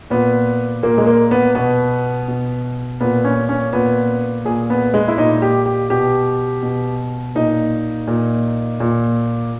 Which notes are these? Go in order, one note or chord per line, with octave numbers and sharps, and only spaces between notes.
A#2 B3
A#2 A#3
G#3
A#3
B3
B2 B3
B2
A#2 B3
C#4
C#4
A#2 B3
A#2 G#4
B3
G#3
E4
A#2 D#4
G4
G4
B2 G4
B2
A#2 D#4
A#2
A#2